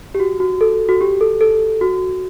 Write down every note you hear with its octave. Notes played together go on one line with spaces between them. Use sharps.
G4
F#4
F#4
A4
F#4
G4
A4
A4
F#4